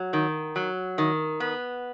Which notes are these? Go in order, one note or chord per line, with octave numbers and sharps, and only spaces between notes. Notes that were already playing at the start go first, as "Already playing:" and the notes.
Already playing: F#3
D#3
F#3
D#3
B3